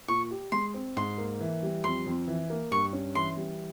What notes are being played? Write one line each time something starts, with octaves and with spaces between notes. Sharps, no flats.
A#2 C#6
G4
G#3 C6
C4
G#2 C6
A#3
E3
G3
F2 C6
F2
E3
A#3
G2 C#6
C#4
E3 C6
G3